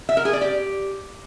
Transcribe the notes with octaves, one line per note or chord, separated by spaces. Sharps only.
E5
A#4
G#4
D5
G4